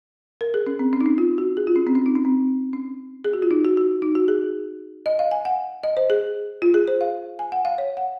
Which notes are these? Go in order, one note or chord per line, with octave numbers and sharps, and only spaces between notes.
A#4
G#4
C#4
C4
C#4
D#4
C#4
F4
F#4
G#4
F4
C#4
C4
C#4
D#4
C#4
C4
C#4
G#4
F#4
F4
D#4
F#4
F#4
D#4
F#4
G#4
D#5
F5
G#5
F#5
D#5
C5
G#4
F4
G#4
C5
F5
G#5
F#5
F5
C#5
F#5